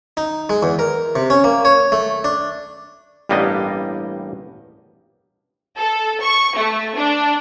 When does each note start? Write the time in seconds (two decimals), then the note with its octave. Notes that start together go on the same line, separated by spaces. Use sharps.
0.17 D#4
0.50 G#3
0.63 E2
0.79 A#4
1.15 C3
1.30 C#4
1.44 A#3
1.65 C#5
1.92 A3
2.24 D4
3.29 A1 G2 G3 A#3 B3 D#5
5.77 A4
6.21 C#6
6.56 A3
6.96 D4